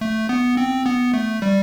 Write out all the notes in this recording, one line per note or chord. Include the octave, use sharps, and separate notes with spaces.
A3
B3
C4
B3
A3
G3